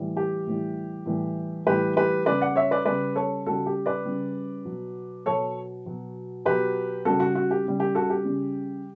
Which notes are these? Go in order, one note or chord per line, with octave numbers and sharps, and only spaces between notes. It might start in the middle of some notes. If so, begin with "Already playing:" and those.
Already playing: A2 E3 G3
G4
A2 E3 G3
A2 E3 G3
A2 E3 G3 G4 B4
G4 B4
C#3 G3 B4 D5
D5 F#5
C#5 E5
B4 D5
C#3 G3 B4 D5
A4 C#5
C#3 G3 F#4 A4
G4
B4 D5
C#3 G3
B2 F#3
B2 F#3 A4 C#5
B2 F#3
B2 F#3 G4 B4
C#3 G3 F#4 A4
F#4
F#4
G4
C#3 G3
G4
F#4 A4
G4
C#3 G3